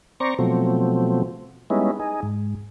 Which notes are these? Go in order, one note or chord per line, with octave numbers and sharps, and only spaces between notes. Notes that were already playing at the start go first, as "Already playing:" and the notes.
C4 C5 D5 A#5 C#6
B2 F3 F#3 A3 C4
G3 G#3 B3 C#4 D#4 E4
D#4 G#4
G#2